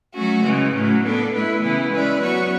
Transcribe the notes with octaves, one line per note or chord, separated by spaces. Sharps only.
F#3 A3 C#4 F#4
C#3 E3 G#3
A2 F#3 A3 C#4
B3 D4 A4
A3 E4 B4
C#3 E3 B3 E4
G#3 C#4 E4 B4 D5
F#3 B3 F#4 C#5